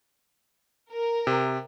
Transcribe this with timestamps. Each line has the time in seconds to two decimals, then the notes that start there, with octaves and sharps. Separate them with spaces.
0.92 A#4
1.27 C3